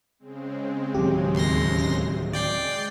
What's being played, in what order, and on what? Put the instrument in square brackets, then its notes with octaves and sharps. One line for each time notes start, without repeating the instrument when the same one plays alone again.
[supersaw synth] C#3 G#3 C4
[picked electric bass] D1 D#3 F#3 [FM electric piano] G4
[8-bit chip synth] D#2 C6 A#6
[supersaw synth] G#3 [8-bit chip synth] D5 G5 C7